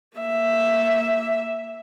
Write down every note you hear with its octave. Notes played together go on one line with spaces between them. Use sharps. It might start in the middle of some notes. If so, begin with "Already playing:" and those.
A#3 E5